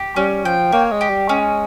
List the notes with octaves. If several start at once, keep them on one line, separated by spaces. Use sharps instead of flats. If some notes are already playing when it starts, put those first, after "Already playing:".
Already playing: G4
G3 C#4
F3 G5
A#3 C#5
G#3
G4
G3
G#3 C#4